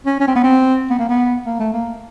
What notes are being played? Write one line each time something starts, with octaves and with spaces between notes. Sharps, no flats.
C#4
C#4
C4
B3
C4
B3
A#3
B3
A#3
A3
A#3